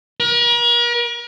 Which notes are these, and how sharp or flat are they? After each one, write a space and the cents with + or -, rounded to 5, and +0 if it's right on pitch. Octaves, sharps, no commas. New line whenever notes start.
A#4 +40